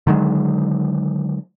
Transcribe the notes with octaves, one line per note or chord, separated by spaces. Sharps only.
D3 D#3 F#3 G#3